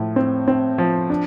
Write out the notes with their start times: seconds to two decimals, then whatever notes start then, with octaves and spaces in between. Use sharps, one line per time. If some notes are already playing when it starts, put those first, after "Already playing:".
Already playing: A2 F3
0.16 C4
0.48 C4
0.78 F3
1.10 D4